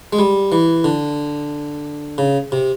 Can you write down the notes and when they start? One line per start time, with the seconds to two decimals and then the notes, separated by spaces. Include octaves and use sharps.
0.13 G#3
0.19 G3
0.52 E3
0.84 D3
2.18 C#3
2.52 C3